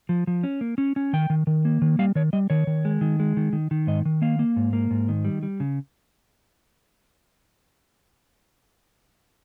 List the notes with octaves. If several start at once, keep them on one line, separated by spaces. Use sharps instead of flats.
F3
F3
C#4
A#3
C#4
C#4
D#3 G5
D#3
D#3
A#3
D#3
G3 F5
D#3 C#5
G3 D#5
D#3 C#5
D#3
G#3
D#3
G#3
D#3
D#3
D#3
G#2 D#5
D#3
A#3 F5
A#3
G#2
A#3
G#2
D#3
G3
G3
C#3